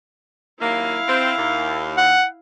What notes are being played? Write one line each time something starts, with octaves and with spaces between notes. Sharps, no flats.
D#2 F#3 A#3 E4 F5
C4
D#2
F#5